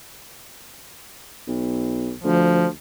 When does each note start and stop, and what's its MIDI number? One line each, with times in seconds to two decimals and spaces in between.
1.47 2.12 35
2.24 2.70 38
2.24 2.67 53